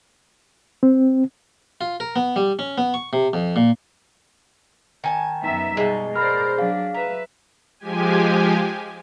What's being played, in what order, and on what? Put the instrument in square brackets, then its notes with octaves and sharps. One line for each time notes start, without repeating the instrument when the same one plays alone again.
[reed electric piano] C4
[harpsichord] F4
A#4
B3
G3
C#4
B3
C#6
C3
F2
A#2
[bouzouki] D#3 G#5 A5
[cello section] F#2 B3 E5 [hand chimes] D#4 A#5
[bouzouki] B2 G#3 [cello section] G3
[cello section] A#4 C5 D5 [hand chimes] B5 F6
[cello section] F#3 D4 [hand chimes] G#4 F5
[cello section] B4 E5 [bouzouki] A#5
[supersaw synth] F3 G#3 G4 G#5